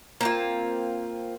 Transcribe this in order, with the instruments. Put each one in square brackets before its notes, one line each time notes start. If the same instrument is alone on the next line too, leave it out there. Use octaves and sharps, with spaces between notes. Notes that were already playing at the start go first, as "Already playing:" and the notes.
[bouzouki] A#3 C4 F4